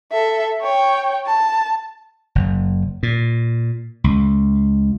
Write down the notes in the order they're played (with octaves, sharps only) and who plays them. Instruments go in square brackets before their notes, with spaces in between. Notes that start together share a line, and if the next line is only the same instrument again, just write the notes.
[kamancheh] A4 E5
C#5 G5
A5
[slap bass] F#1
A#2
C#2